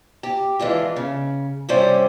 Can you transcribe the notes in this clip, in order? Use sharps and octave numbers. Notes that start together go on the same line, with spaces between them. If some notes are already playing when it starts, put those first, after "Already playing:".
G4
E3 G#3 D4 F4
C#3
G2 C3 G3 C#4 C5 D5